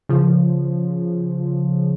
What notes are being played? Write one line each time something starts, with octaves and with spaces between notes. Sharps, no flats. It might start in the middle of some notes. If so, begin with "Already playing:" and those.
C#3 F3